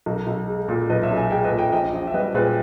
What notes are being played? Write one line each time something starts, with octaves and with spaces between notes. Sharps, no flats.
B1 A#4
B1
G#3
A#2
B1 B4 D#5
C#5 E5
B1
E5 G#5
G#3 D#5 G5
B4 D#5
A#2
D#5 G5
A#1 D#5 G5
A#1
E5
G3 B4 D#5
A#2 G#4 B4